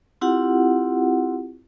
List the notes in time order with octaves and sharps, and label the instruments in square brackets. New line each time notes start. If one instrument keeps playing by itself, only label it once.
[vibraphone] C4 E4 F4 G4 F#5